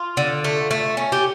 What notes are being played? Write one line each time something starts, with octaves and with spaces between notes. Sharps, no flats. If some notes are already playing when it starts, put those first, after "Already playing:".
Already playing: F4
D3
A3
A3
C#4
G4